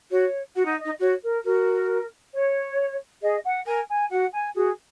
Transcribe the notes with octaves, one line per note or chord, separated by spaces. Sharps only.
F#4 C#5
F#4 F#5
D#4
D#5
D#4
F#4 C#5
A#4
F#4 A#4
C#5
G#4 D#5
F#5
A#4 G#5
G#5
F#4 F#5
G#5
F#4 G#4